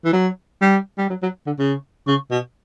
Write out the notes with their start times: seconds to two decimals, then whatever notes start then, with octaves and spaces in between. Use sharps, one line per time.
0.05 E3
0.13 F#3
0.62 G3
0.98 G3
1.10 F#3
1.23 F#3
1.46 D3
1.59 C#3
2.07 C#3
2.31 B2